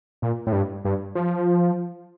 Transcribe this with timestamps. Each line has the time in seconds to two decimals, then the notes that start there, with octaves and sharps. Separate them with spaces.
0.22 A#2
0.47 A2
0.53 G2
0.85 G2
1.15 F3